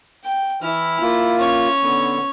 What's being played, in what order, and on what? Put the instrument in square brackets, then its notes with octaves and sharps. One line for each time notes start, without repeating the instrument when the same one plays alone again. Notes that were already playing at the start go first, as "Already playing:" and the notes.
[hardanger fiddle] G5
[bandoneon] E3 F6 [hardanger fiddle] E4
[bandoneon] A#3 F4
[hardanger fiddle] C#4 C#5
[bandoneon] D3 B3